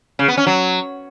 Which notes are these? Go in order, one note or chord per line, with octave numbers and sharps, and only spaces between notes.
C#3
B3
C#4
F#3